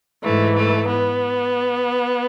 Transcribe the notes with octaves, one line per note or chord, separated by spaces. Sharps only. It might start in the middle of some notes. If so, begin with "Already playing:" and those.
G#2 E3 A3
A3
B3